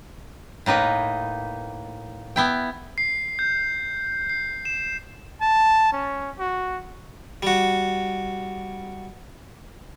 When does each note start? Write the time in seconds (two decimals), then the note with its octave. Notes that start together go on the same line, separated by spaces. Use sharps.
0.66 A2 A#3 D#4 B4
2.36 B3 E4 G5
2.98 C7
3.39 G6
4.30 C7
4.65 E7
5.42 A5
5.92 C#4
6.39 F#4
7.43 G3 F#4